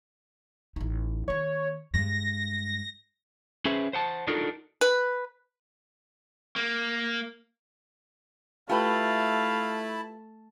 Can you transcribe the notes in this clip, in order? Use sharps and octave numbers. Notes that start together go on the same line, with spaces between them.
A1 D#4
D#3 A#3 C#5
G2 G#3 A#6
C#4 G#4 B4 C5 E5
C5 F#5 A5
D4 D#4 F4 F#4 A4 A#4
B4
A#3
A3 E4 F4 G4 B4 F5 A5 B5